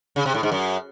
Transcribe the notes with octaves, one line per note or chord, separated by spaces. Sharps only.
C#3
C3
A2
G#2
F#2